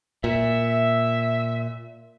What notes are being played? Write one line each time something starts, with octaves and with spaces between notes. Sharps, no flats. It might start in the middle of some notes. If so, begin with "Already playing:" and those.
A#2 E5